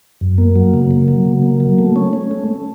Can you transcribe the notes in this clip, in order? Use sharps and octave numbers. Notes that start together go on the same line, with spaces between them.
F#2
A#3
F#3
C#3
A#3
F#3
C#3
A#3
F#3
A3
C#4
C#4
A3
A3